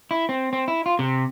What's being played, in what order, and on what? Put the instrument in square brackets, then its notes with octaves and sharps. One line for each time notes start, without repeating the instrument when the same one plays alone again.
[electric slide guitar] E4
C4
C4
E4
F4
C3